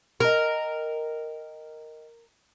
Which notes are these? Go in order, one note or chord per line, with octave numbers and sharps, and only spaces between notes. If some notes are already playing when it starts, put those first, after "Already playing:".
A#4 D#5 G5